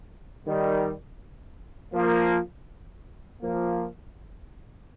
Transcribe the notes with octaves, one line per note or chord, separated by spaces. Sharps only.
D#3 G3
F3 A#3
F3 A#3